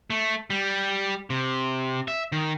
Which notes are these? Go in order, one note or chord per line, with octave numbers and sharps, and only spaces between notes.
A3
G3
C3
E5
D#3